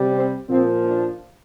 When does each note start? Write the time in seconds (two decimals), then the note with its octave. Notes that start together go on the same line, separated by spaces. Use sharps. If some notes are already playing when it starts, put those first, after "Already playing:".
Already playing: C3 G3
0.12 C4
0.49 A#2 F3 C4
0.85 D4